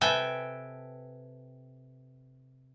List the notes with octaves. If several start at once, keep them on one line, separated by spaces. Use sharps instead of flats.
C3 A4 B4 G5 G#5